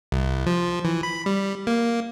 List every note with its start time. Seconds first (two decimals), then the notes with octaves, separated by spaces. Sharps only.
0.12 C2
0.46 F3
0.85 E3
1.03 B5
1.26 G3
1.67 A#3